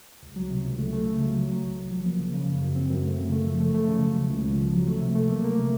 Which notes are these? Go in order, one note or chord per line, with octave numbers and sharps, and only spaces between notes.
C#2
F#3
C3
C#2
A3
A3
C#3
F#3
F#3
F#3
C2
C2
F3
A#3
C#3
C#3
F#2
F#2
C4
F#2
A3
C#3
A3
F3
A3
A3
C#3
F#3
C#2
C#2
C#2
F3
F#3
A3
C3
A3
A#3
A#3
C3